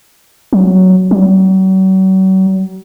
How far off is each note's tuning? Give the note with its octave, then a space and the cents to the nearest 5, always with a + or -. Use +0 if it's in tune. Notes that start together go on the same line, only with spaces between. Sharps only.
F#3 +5
F#3 +40